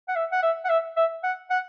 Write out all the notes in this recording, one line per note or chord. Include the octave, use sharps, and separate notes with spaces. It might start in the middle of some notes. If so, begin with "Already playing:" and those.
F#5
E5
F#5
E5
F#5
E5
E5
F#5
F#5